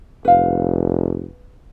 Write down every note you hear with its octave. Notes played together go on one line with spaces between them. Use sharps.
F1 B4 F5